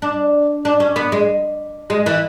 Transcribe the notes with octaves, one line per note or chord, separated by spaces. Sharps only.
D4
D4
C#4
B3
G#3
G#3
E3